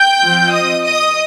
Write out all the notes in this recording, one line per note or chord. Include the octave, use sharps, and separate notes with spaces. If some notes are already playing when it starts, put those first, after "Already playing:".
Already playing: G5 G6
F3 C4 F4
D#5 D#6
D#5 D#6